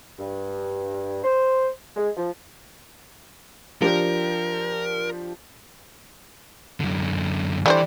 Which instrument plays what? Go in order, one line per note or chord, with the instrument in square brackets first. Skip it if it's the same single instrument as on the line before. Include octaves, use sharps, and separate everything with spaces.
[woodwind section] G2
C5
G#3
F3
[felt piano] F3 D4 G4 [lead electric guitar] A#4
[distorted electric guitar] F#2 D3
[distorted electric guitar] E3 [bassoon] G3 [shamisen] A3 D4 C5